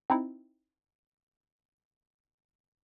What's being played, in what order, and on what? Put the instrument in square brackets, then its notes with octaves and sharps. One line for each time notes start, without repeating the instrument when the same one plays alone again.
[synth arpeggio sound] C4 D#4 E4